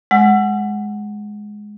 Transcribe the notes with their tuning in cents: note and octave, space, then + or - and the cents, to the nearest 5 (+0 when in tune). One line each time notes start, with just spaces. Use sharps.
G#3 +5 F#5 +0 E6 +40